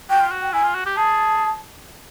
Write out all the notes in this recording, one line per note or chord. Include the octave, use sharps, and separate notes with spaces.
F#4 G5
F4
F#4
G5
E4 G#5
F4
F#4
G4
G#4 A5